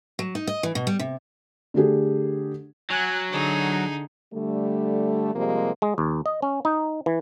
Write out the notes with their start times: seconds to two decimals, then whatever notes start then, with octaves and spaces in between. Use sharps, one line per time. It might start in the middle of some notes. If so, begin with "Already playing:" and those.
0.19 F#3
0.35 D#4
0.47 D#5
0.63 E3
0.75 B2
0.87 G3
0.99 C3
1.74 D3 A3 D4 G4 G#4
2.90 F#3 G#5 F#6
3.32 D3 D#4 G#4
4.33 D3 G3 A3
5.35 C3 F3 G3 G#3 A#3
5.82 G#3
5.98 D#2
6.26 D#5
6.42 C#4
6.65 D#4
7.06 E3